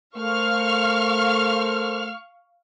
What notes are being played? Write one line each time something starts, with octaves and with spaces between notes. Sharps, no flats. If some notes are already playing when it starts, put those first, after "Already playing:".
A3 A4 A#4 C5 F5 C#6 F6